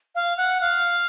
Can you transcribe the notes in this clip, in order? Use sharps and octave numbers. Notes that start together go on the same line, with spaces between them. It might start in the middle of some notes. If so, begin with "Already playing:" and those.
F5
F#5
F5